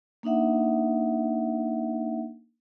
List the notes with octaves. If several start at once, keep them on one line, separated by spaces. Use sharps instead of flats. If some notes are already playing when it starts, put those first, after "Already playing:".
A#3 D4 D#4 E5 F#5